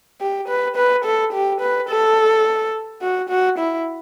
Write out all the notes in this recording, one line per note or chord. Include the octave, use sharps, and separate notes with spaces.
G4
B4
B4
A4
G4
B4
A4
F#4
F#4
E4